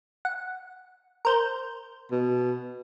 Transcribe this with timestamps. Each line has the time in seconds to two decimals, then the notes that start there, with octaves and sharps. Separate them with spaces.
0.25 F#5
1.25 A#4 C5 G6
2.12 B2